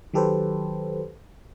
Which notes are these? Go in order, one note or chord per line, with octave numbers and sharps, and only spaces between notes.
D#3 F#3 G4 A4 B4 C5